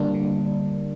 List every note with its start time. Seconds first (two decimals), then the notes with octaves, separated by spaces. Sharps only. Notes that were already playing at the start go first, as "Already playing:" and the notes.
Already playing: D3 G3 A#3 D4
0.14 D3